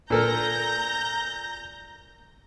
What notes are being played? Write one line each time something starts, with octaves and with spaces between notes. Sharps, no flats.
A#2 A4 A#4 A#5 G6 A#6